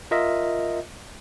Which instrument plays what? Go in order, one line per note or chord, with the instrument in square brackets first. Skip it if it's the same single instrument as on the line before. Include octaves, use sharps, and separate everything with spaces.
[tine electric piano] F4 A#4 D#5 E5